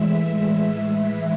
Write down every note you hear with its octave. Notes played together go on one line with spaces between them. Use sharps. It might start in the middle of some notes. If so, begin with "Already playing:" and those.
Already playing: A2 E3 G#3 E5